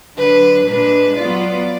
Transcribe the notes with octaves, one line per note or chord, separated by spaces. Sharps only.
D3 F#3 D4 B4
A#2 G#3 D4 B4
F#3 B3 F4 D5